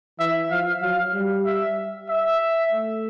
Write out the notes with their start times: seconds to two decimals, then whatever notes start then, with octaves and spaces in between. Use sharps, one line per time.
0.20 E3 E5
0.50 F3 F5
0.82 F#3 F5
1.14 G3
1.46 E5
2.09 E5
2.72 A3